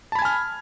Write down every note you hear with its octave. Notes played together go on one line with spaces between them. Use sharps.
G#5 A5 B5 F6 G#6